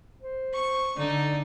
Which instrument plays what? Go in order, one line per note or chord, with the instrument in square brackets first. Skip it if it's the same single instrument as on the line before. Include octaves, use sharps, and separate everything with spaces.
[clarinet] C5
[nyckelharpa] C#6
[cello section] D3 [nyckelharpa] D#4 [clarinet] D5